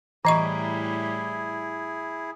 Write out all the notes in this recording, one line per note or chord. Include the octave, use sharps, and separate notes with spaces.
A2 E3 G3 E4 G#4 D#5 A#5 C#6